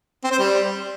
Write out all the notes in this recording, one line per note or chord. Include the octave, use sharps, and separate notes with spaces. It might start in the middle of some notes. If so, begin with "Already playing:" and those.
C4
C5
G3